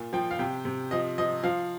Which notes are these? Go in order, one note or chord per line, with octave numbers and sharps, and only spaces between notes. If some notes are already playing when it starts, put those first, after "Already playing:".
Already playing: A#2
F3 G5
F5
C3 G5
C3
F3 D#5
F3 D#5
F3 F5